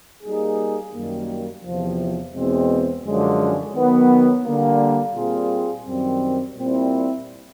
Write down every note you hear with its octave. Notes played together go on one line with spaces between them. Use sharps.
G3 A#3 D#4 G#4
F#2 D#3 G3 A#3
E2 C3 F3
E2 B2 G#3 C4
F#2 D3 F3 G#3 C#4
D#3 F#3 B3
D3 G3 A#3
A#2 G3 C4 F4 G#4
F#2 D#3 G3 C4
A#2 G3 C4 E4